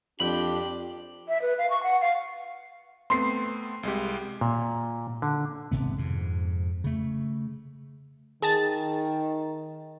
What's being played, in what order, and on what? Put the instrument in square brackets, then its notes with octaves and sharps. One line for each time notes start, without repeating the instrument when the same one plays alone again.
[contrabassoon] F2 [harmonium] D4 G4 [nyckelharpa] G5 [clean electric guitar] B5
[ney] E5
B4
F5
C#6
F#5
F5
[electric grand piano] A3 B3 C4 [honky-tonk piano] C6 C7
[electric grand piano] C2 G#3 G4
[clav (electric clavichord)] A#2
D3
[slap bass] G#1 C3 B3
F2 G#2
C#3 A3
[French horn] D#3 [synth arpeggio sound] G#4 A5 A6